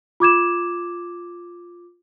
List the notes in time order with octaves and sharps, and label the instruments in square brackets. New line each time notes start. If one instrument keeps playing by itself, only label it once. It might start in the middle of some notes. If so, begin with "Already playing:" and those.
[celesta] F4 D6 G#6 E7